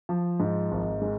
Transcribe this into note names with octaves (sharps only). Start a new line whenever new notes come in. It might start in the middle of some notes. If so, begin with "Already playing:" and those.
F3
G#2
G#1
G#3